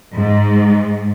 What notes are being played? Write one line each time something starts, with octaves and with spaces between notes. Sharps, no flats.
G#2